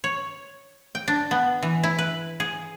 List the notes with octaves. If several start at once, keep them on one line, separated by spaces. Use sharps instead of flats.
C#5
G5
D4
B3
E3
E4
B4
G#4